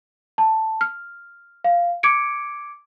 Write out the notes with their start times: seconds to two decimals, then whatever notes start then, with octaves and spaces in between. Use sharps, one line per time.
0.38 A5
0.81 F6
1.64 F5
2.03 D6 G#6 C#7 D7